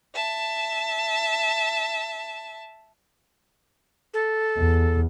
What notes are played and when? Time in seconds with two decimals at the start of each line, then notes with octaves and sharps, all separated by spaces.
0.14 E5 A5
4.14 A4
4.58 E2